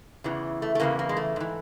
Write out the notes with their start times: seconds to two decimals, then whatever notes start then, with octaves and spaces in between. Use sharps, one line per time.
0.24 E2 C#3 E3
0.62 A3
0.75 A3
0.80 E2 C#3 E3 A#3
0.99 A#3
1.09 G#3
1.17 A3
1.36 G#2 E3